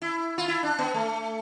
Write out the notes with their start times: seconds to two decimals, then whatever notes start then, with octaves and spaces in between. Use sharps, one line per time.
0.02 E4
0.38 F4
0.48 E4
0.63 D4
0.79 B3
0.94 A3